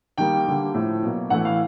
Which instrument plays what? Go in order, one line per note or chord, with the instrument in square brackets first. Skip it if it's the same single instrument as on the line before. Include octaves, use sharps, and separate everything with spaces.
[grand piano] D#3 G3 A#3 G5
D3 G3 A#3
A2 F3 A3
B2 F#3 A#3
A2 E3 A3 F#5
F5